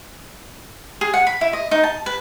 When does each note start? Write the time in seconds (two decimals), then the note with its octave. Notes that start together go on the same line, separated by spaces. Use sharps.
1.01 G#4
1.14 F#5
1.27 B5
1.41 E4
1.53 D#5
1.71 D#4
1.83 A5
2.06 B4